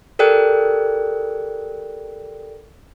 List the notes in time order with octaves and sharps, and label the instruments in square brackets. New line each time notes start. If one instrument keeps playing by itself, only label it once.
[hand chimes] G4 A4 A#4 D5 G5 F#6